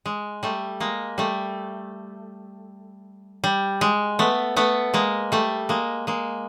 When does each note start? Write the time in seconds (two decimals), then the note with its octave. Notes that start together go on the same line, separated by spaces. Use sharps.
0.06 G#3
0.43 G3 A3
0.80 G#3 A#3
1.18 G3 A3
3.44 G3
3.81 G#3
4.19 A3 B3
4.56 A3 B3
4.94 G#3 A#3
5.32 G3 A3
5.69 G#3 A#3
6.07 G#3 A#3